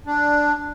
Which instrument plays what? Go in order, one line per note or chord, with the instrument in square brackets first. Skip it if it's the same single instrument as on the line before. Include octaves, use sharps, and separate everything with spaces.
[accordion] D4